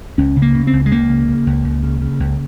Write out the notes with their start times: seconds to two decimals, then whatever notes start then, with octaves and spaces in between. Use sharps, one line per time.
0.18 C#2 C#4
0.36 C#3
0.42 A#3
0.55 C#3
0.67 C4
0.73 C#2
0.86 G#3
0.91 C#2 A#3
1.10 C#3
1.28 C#3
1.46 C#2
1.64 C#2
1.83 C#3
2.02 C#3
2.20 C#2